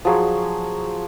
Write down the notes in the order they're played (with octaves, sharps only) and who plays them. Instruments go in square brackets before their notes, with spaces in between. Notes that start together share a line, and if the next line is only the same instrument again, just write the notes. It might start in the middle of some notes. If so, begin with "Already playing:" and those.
[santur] F3 F#3 G#4 C#6